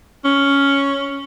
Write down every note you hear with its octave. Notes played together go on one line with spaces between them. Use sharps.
C#4